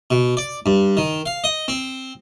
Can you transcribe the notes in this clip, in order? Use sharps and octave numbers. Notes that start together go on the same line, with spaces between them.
B2
D5
G2
D#3
F5
D#5
C4